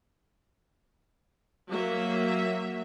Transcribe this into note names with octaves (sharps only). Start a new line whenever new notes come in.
F#3 A#3 E5